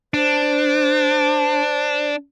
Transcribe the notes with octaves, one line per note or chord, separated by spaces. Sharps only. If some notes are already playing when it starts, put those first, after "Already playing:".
D4 C5